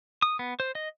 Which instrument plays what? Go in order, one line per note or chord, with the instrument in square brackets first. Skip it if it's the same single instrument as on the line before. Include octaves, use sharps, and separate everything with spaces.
[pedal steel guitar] D#6
B3
C5
D#5